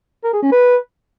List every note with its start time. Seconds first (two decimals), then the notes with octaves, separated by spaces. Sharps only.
0.24 A#4
0.33 G#4
0.43 C#4
0.52 B4